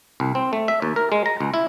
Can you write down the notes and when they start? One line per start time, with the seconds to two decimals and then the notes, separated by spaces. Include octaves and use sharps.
0.20 C2
0.35 C4
0.53 A3
0.68 E5
0.82 D#2
0.96 A#4
1.12 G#3
1.26 A#5
1.40 C#2
1.54 E4